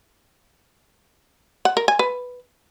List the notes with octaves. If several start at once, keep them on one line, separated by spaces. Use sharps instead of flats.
F#5
A#4
G#5
B4